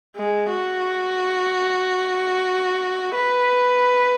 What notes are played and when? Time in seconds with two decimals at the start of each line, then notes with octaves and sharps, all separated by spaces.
0.16 G#3
0.49 F#4
3.15 B4